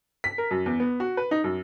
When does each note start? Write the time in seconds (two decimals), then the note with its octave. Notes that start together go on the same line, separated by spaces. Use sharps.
0.24 B6
0.38 A#4
0.51 F#2
0.66 E2
0.80 B3
1.00 F#4
1.17 B4
1.31 D#4
1.44 F#2